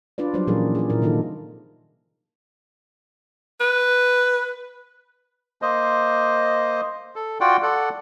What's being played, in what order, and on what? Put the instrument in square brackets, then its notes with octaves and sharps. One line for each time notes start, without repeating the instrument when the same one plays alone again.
[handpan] D4 F4 B4 D5
F#3 G3 D4 C5 D5
A#2 E3 F3 C#4 G#4 A#4
G#4 D5
A#2 E4 A#4
C3 D#3 D#4 F4 A4
[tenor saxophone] B4
[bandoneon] A#3 C5 D#5
A4
F4 F#4 D5 F#5 G5
A4 D5 F#5